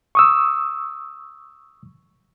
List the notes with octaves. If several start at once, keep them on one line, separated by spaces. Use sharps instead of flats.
C#6 D#6 E6